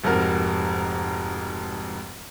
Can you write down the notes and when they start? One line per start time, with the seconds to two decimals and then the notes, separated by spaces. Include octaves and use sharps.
0.04 F1 F2 G#2 F#4 A#4